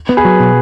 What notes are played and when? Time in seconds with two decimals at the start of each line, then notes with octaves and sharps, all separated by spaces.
0.09 B3
0.17 G#4 B4
0.25 F#3
0.40 B2